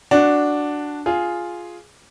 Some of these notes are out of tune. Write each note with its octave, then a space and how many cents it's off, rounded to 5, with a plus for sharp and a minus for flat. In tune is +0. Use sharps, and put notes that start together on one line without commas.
D4 +0 F#4 +0
F4 +0 G#4 +5